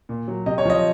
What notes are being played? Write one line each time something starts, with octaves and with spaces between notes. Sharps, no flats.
A#2
F#3
C3 D#5
C#5
F3 D#5